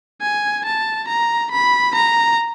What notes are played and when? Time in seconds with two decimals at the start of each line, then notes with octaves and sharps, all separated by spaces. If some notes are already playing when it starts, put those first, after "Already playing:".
0.22 G#5
0.65 A5
1.08 A#5
1.51 B5
1.96 A#5